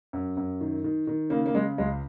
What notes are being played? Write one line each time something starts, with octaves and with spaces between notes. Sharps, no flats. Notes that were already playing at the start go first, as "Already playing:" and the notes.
F#2
F#2
D#3
D#3
D#3
C#3 A#3
A#3
C#3 G#3
C#2 G#3